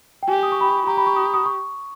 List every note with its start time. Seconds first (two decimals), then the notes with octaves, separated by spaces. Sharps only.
0.23 G5
0.28 G4 G#5
0.43 D#6
0.52 C#6
0.61 B5
0.70 C#6
0.86 G4 A#5
0.97 B5
1.07 C#6
1.16 D#6
1.34 D#6
1.46 C#6